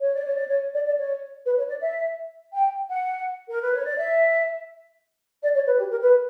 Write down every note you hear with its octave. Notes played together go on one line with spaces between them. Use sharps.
C#5
D5
C#5
D5
C#5
D5
D5
C#5
B4
C#5
D5
E5
G5
F#5
A#4
B4
C#5
D5
E5
D5
C#5
B4
G4
A#4
B4